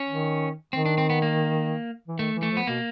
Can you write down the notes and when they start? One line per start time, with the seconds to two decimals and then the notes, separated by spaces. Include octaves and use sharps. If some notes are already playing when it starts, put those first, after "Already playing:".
Already playing: C#4
0.09 D#3
0.73 D#3 C4
0.86 D4
0.98 C4
1.10 B3
1.22 A#3
2.07 E3
2.19 D#3 A3
2.35 E3
2.43 A3
2.51 F3
2.57 B3
2.67 B2 A#3